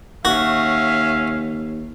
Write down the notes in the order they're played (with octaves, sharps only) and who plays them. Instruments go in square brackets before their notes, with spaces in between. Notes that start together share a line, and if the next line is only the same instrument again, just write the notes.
[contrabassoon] D#2 [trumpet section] C#4 E5 F5 [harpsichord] F#4